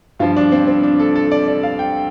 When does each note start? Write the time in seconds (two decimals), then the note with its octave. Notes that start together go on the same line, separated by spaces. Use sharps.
0.20 G2 F3 F4
0.36 D4
0.52 C4
0.67 C4
0.83 D4
1.00 A4
1.15 A4
1.31 D5
1.48 D5
1.63 F5
1.79 G5